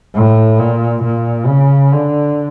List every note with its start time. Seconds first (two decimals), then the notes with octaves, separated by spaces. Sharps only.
0.14 A2
0.59 A#2
1.03 A#2
1.47 C#3
1.92 D3